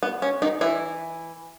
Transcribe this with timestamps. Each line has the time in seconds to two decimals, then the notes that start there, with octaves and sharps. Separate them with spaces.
0.03 B3
0.22 C#4
0.42 D#3 D#4
0.61 E3 E4